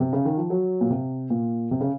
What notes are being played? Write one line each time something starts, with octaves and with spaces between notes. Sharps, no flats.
C3
C#3
D#3
F3
F#3
A#2
C3
A#2
C3
C#3